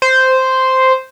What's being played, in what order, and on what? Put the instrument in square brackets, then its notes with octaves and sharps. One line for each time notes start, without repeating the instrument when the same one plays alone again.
[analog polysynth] C5